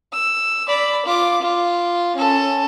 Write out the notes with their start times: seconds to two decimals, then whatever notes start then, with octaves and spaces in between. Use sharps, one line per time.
0.13 E6
0.68 D5 B5
1.06 F4 D6
1.41 F4
2.16 C#4 A4